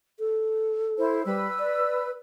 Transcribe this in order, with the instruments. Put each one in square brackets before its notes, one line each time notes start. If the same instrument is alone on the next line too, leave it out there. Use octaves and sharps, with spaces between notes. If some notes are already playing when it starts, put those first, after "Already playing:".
[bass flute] A4
[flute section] E4 C5
[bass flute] G3 [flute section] B4 E6
[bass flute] D5